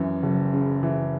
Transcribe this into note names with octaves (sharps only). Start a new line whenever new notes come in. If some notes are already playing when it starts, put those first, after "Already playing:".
Already playing: F#2 E3
F#1
C#3
E3